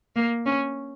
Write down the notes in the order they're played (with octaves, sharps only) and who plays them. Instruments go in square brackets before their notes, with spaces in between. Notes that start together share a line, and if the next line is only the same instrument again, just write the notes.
[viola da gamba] A#3
C#4